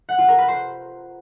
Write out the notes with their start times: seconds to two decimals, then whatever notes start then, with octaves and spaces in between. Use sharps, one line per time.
0.09 F#5
0.19 F4
0.28 A#4
0.38 B4
0.48 C5